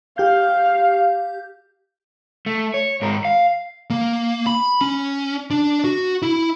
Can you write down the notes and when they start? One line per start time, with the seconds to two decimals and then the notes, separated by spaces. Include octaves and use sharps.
0.18 G4 F5 G6
2.46 A3
2.74 C#5
3.02 G#2 A#4
3.25 F5
3.90 A#3
4.46 B5
4.81 C#4
5.51 D4
5.84 F#4
6.22 E4